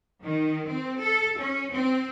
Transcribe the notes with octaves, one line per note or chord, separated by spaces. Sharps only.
D#3
C4
A4
C#4
C4